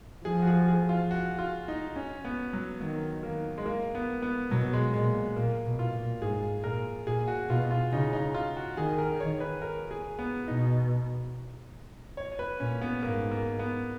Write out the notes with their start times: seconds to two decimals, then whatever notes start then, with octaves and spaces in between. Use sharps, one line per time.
0.25 F3 G#4
0.42 F#4
0.47 G#4
0.68 G#4
0.89 F4
1.11 F#4
1.39 F4
1.68 D#4
1.96 C#4
2.25 B3
2.53 F#3
2.81 D#3 F#3
3.23 A#3
3.58 G#3
3.66 A#3
3.95 B3
4.22 B3
4.51 B2 F#3
4.73 G#3
4.93 A#2 G#3
5.36 A#2 A#3
5.66 B2
5.79 F4
5.93 A#2
6.22 G#2 G#4
6.64 A#2 A#4
7.07 A#2 G#4
7.28 F#4
7.49 B2 F4
7.71 F4
7.92 C#3 D#4
8.13 D#4
8.34 F4
8.56 F#4
8.77 D#3 G#4
8.98 A#4
9.20 C#5
9.40 B4
9.62 A#4
9.91 G#4
10.19 B3
10.47 B2 D#4
12.17 C#5
12.39 B4
12.60 A#2 C#4
12.81 B3
13.03 G#2 A#3
13.31 A#3
13.59 B3